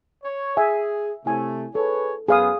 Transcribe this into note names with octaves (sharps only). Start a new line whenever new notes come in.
C#5
G#4 E5 G#5
C3 A3 E4 G#5
G#4 A4 B4 C#5
F#2 B3 G#4 F5 D#6